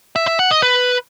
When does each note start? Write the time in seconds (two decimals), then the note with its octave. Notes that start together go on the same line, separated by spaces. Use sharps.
0.16 E5
0.27 E5
0.39 F#5
0.51 D#5
0.63 B4